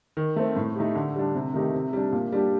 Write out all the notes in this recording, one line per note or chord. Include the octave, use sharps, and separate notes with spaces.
D#3
A3 C4
A2
A3 D#4 G4
D3
G3 D4
C3
D#3 A3 D#4 G4
C3
G3 D4
A#2
G3 D4 G4